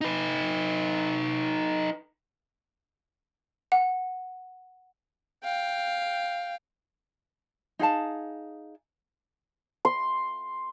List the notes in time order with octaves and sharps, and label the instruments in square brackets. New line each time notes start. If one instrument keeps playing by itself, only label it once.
[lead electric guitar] D#4 B4
[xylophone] F#5
[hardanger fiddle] F5 G5
[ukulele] D#4 G#4 F5 A5
[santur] C6